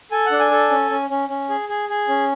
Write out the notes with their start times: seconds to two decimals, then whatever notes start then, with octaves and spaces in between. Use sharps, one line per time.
0.11 A4 G#5
0.26 F#5
0.31 D4
0.39 G#5
0.51 A4
0.70 C#4
0.90 C#4
1.10 C#4
1.29 C#4
1.50 G#4
1.69 G#4
1.89 G#4
2.08 C#4